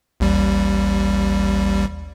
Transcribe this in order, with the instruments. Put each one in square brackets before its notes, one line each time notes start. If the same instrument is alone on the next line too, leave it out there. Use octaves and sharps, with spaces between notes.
[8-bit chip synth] A1 D#2 G3